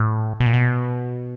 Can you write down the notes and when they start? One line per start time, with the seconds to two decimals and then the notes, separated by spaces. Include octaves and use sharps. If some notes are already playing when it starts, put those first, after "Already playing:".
Already playing: A2
0.40 B2
0.46 A#2
0.53 B2